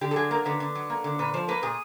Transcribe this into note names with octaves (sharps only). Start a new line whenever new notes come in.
D3 G4
A4
F#3 G#4
A#3 A#4
D3 B4
D3
F#3
A#3
D3
A#2 B4
F3 C5
A#3 B4
A#2 G#4